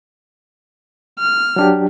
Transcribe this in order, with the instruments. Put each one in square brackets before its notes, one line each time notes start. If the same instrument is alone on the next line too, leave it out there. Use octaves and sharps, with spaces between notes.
[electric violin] F6
[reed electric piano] F#3 D4 G4